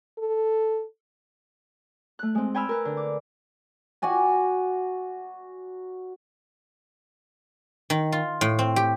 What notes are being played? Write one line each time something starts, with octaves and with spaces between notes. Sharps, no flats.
A4
A3 F#6
G#3 C4
G5 G#5 B5 E6 F6
A#4 B4
D3
D6
F#4 D5 G#5 A#5
D#3
F4
A2
C4
G4